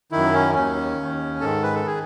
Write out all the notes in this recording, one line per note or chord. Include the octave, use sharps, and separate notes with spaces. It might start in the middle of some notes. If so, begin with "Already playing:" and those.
F#2 D#3 E4
C#4
D#2 D#3 C#4
D#2 D#3
G#2 D#3 A4
B4
A4
D#3 G#4